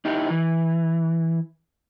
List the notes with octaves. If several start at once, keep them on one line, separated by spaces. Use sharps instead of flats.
D#4 E4 G4
E3